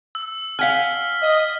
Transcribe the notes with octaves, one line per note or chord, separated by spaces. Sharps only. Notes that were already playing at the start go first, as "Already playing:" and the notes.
E6
F5 F#5 G#5 F6 B6
D#5